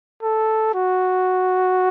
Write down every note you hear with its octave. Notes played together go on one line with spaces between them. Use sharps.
A4
F#4